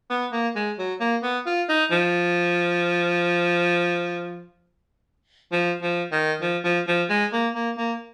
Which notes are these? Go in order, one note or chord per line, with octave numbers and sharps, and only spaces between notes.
B3
A#3
G#3
F#3
A#3
B3
F4
D#4
F3
F3
F3
D#3
F3
F3
F3
G#3
A#3
A#3
A#3